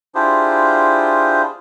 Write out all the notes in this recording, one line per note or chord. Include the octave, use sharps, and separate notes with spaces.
D4 E4 F4 G4 G#4 C5